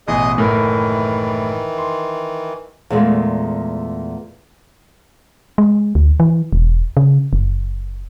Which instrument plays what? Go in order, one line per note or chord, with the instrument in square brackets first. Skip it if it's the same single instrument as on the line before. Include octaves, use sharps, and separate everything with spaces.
[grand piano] A1 B2 E3 [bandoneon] G#4 D#5 D#6
[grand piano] F#1 A2 A#4 [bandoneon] D#3 E3
[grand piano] C6
[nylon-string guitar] E2 A#2 G#3 A3
[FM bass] G#3
D2
E3
E1
C#3
F#1